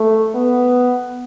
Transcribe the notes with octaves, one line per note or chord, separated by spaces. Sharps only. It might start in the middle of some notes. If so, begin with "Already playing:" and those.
Already playing: A3
B3